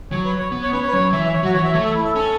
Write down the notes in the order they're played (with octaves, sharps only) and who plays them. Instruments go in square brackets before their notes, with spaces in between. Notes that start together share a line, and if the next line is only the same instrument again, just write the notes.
[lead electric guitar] F#3 [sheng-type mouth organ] C#5
[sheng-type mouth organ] B4
C#5
[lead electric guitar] B3
[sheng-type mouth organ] C#5
[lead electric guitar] C#4 [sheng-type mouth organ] B4
[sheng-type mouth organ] C#5
B4
[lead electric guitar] F#3 [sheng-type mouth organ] C#5
[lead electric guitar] E3 [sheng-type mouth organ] E5
[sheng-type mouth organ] E5
C#5
[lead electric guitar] F#3 [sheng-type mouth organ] F#4
[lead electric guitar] E3 [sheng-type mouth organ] C#5
[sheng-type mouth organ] E5
[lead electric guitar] A3 [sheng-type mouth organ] C#5
[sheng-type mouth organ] A4
E4
A4
[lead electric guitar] C#4 [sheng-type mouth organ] A4